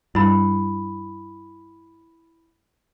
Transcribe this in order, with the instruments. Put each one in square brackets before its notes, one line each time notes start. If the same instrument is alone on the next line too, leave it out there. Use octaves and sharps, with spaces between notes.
[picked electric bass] G2 [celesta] E4 B5